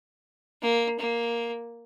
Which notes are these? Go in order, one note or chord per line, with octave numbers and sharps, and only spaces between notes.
A#3
A#3